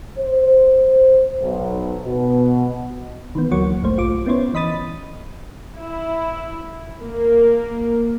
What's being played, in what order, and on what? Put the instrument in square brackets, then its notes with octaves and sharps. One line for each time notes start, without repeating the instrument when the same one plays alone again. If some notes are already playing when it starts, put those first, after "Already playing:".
[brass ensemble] C5
B1
B2
[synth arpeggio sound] D#3 E3 B3
D2 F#3 A#3 F#4 C#5 C#6
A1 G2 A3 C5
B1 F4 D6
B3 C#4 E4 C5 C#5
E3 D#5 B5 D#6 A6
[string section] E4
A#3